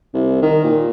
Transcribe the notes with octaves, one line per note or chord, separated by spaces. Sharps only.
C2
D#3
A#2